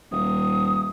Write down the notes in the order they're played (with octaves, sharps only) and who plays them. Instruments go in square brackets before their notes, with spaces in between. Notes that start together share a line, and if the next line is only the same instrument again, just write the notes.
[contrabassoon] D#1 [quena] D#6